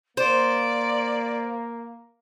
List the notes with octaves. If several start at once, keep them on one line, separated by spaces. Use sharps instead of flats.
A#3 C5 D5